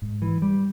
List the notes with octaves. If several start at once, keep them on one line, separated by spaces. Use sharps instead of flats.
G#2
E3
G3